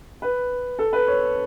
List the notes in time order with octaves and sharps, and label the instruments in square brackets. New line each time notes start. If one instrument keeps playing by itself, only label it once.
[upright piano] B4
A4
B4
C#5